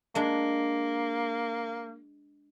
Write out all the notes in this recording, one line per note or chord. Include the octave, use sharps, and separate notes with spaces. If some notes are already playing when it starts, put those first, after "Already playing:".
G#3 A#3 D4